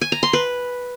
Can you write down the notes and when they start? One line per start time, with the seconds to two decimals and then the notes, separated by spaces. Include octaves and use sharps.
0.01 G#5
0.12 A#5
0.23 C6
0.33 B4